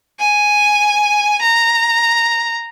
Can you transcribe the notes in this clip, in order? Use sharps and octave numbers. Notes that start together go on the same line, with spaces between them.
G#5
A#5